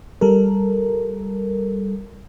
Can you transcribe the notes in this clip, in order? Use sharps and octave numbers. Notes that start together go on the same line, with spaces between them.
G3 A4 A#4